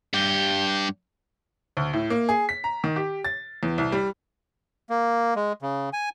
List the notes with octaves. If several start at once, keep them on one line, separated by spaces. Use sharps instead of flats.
G2 G4 G6
D2
A2
A#3
G#4
B6
A#5
D#3
G4
A6
E2
C2
G3
A#3
G#3
C#3
G#5